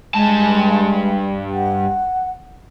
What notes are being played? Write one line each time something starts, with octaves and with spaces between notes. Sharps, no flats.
G2 G#3 A5
F#5